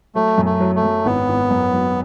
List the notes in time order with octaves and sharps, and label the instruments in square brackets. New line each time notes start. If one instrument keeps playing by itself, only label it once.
[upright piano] F#3 [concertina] A3
[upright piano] F#2
[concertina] A3
[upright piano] F#3
[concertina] A3
[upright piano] F#2
[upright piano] G#1 [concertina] B3
[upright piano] G#1
F#2
F#3